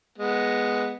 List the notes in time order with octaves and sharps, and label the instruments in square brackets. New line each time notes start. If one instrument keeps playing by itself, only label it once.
[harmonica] G#3 B3